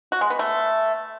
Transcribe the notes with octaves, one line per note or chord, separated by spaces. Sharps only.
F#4
G#3
B3
A3